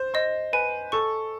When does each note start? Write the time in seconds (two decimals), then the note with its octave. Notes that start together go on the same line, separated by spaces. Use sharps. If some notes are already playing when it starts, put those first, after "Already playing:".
Already playing: C5
0.14 C5 D#5
0.53 B4 G#5
0.92 A4 C#6